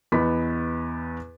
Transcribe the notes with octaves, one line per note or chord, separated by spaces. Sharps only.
E2 B3 D#5 B5 B6